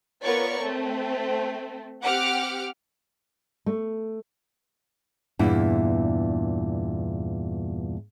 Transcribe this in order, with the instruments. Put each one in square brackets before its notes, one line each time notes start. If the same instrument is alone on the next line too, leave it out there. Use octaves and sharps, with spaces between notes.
[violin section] B3 F4 A#4 C#5 D5 C#6
A3 C4
C4 G4 F#5 D6 F6
[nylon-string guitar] A3
E2 G2 A#2 E4